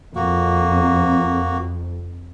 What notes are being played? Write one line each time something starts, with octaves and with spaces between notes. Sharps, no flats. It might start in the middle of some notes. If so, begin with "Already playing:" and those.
F2 A#3 F#4